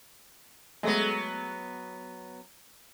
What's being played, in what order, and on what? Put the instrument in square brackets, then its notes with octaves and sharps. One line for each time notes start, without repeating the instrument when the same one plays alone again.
[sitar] F#3 B3 [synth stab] G#3 A3 A#6